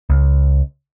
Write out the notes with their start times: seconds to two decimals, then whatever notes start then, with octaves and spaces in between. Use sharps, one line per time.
0.10 C#2